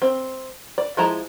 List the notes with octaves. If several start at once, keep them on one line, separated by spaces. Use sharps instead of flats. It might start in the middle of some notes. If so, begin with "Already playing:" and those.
C4
D5
F3 G#3 E4 A5 A#5